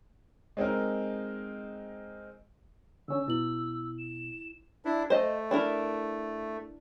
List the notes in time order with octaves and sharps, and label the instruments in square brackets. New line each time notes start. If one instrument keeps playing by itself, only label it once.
[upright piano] G#3 C4 D#4 A#4
[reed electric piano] D3 C#4 [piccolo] E6
[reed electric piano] B2 [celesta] E4 F#7
[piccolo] E7
[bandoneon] D4 E4
[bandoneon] A3 [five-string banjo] C5 D#5
[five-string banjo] D4 E4 A#4